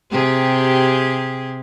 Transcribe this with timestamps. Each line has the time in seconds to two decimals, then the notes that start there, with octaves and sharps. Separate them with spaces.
0.11 C3 G4 G#4